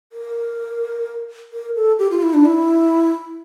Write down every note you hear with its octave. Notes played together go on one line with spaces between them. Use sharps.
A#4
A#4
A4
G4
F4
E4
D4
E4